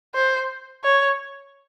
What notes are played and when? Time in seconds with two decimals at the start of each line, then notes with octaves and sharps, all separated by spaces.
0.15 C5
0.84 C#5